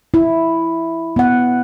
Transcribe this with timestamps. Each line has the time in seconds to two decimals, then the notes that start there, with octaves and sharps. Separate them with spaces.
0.14 E4
1.16 B3 F#5